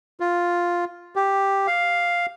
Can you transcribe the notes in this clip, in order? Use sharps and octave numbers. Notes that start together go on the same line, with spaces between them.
F4
G4
F5